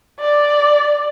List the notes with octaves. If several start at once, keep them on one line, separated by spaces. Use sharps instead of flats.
D5